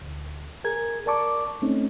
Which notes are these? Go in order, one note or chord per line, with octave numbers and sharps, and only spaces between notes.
D2
G#4 A#4 G#6
A#4 D5 A5 C#6 D6
A3 C4 C#4 D#4